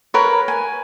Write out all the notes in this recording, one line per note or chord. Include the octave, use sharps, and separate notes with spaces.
A#4 B4 C#5
G#5